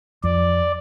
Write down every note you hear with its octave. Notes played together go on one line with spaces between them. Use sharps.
F2 D5